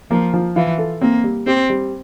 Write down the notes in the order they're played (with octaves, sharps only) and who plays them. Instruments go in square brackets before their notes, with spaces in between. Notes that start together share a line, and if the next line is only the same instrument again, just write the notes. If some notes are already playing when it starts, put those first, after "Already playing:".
[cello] F3 [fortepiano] A#3
[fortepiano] F3
[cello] E3 [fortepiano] F4
[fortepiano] A4
[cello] A#3 [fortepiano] C4
[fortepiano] G3
[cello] C4 [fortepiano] G4
[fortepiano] G3